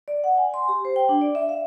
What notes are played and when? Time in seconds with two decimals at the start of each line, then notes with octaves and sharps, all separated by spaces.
0.08 D5
0.24 F#5
0.38 G#5
0.54 C6
0.68 G4
0.85 C5
0.96 G5
1.09 D4
1.21 D5
1.35 E5
1.49 F5